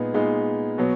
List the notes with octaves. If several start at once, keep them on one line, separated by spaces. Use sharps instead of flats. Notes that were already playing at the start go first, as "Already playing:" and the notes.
Already playing: A#2 G#3 B3 D#4 G#4
A#2 G#3 B3 D#4 G#4
B2 F#3 B3